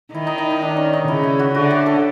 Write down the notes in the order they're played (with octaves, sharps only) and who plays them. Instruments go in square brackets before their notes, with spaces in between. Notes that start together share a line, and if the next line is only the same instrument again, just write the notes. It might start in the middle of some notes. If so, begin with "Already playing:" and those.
[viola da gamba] D#3 [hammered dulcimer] E4
[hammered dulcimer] D#4
D#4
D#4
D4
C#4
D#4
[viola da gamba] C#3 [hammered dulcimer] E4
[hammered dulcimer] E4
F#4
[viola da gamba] D3 [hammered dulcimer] F#4
[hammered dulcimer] G4
A4